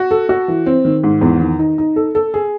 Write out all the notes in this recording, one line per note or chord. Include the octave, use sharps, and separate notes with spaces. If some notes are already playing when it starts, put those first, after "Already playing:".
Already playing: F#4
A4
F#4
E3
C4
D#3
G#2
E2
D#3
D#4
D#4
A4
A4
G#4